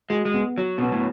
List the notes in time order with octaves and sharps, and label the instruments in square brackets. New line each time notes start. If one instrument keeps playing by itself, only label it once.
[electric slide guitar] G#3 [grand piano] F#4
[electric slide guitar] G#3
[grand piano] B3
[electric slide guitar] F#3 [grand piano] F#4
[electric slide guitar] B2 [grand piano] B3
[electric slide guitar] A2